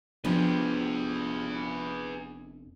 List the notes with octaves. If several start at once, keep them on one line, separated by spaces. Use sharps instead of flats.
F1 F3 B3 D4 G4 G#4 B4